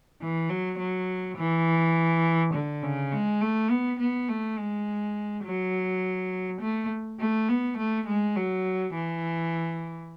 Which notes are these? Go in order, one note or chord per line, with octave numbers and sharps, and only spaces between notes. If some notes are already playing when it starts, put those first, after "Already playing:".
E3
F#3
F#3
E3
D3
C#3
G#3
A3
B3
B3
A3
G#3
F#3
A3
A3
B3
A3
G#3
F#3
E3